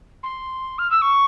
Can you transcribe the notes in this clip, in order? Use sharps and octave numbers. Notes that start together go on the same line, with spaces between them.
C6
F6
E6
C#6